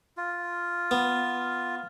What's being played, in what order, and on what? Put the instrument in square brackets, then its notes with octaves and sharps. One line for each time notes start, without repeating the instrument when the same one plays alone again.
[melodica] F4
[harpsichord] B3